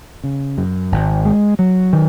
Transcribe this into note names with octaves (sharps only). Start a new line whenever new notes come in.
C#3
F#2
G#1
G#3
F#3
D#3